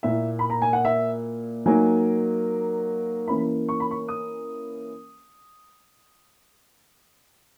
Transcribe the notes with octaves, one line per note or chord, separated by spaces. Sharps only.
A#2 A#3 E4 E5
B5
A#5
G#5
F#5
E5
F#3 A#3 D#4 G#5
E3 A#3 C#4 E4 B5
C#6
B5
C#6
D#6